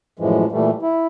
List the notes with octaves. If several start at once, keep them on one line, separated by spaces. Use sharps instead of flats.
F#2 A2 E3 F3 G#3
A#2 E3 G3 A3
E4